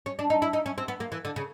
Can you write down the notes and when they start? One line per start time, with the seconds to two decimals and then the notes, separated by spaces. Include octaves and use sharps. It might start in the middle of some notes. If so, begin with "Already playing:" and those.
0.06 C#4
0.19 D4
0.30 D#4
0.42 E4
0.53 D#4
0.66 C#4
0.78 C4
0.88 B3
1.00 A#3
1.12 E3
1.25 D3
1.36 C#3